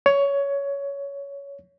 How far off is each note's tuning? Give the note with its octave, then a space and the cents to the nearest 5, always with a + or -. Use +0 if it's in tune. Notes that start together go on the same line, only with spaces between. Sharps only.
C#5 +15